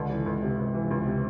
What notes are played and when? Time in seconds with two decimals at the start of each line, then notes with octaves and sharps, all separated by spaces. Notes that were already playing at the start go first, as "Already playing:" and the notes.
Already playing: C#2 D3
0.10 E3
0.26 C#2
0.42 C3
0.58 C#2
0.74 E3
0.90 C#2
1.06 C3